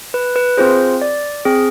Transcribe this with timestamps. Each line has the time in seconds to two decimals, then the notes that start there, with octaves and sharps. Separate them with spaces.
0.14 B4
0.36 B4
0.57 C4 F4 G#4 C5
1.02 D5
1.45 C4 G#4